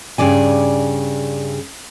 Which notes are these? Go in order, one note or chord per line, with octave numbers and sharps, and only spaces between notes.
G2 C#3 D5 G#5